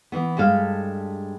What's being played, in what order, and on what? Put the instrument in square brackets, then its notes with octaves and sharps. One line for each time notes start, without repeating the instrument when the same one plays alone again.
[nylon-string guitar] E3 B3
G2 G#3 A4 F5